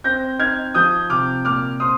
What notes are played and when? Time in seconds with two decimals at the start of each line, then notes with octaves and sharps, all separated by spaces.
0.04 C4 G6 A#6
0.39 D#4 F6 G#6
0.75 F3 D#6 G6
1.10 C3 D6 F6
1.45 A#2 D6 F6
1.80 C4 C6 D#6